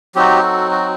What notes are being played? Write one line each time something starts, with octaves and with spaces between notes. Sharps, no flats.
F#3 C4 D#4 F#4 G4
F#4 A4
F#4